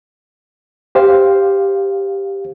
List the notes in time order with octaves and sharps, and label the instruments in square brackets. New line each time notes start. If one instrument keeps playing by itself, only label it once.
[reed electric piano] G4 C5 F5